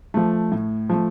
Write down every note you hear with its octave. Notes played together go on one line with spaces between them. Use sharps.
F3 A3
A2
F3 A3